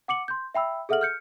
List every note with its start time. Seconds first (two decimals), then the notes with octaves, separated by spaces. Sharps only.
0.08 F#5 D6 C#7 F#7
0.28 C6 G6
0.55 E5 G5 B5 E6
0.89 G#4 A4 E5 F#5 F6 F#7
1.01 F6 G6 C#7